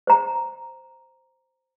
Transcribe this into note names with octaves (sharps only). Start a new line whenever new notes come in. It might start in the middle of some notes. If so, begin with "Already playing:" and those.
C5 A#5